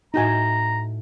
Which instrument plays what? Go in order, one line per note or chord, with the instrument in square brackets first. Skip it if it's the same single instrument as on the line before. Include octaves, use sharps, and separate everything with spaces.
[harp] A2 G6 E7 [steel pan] D#4 F#4 G#5 [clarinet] A#5